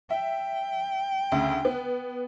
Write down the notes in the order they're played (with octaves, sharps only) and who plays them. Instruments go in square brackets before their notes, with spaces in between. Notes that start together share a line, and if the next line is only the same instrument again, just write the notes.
[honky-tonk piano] E5 [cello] G5
[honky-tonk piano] D2 C#3
B3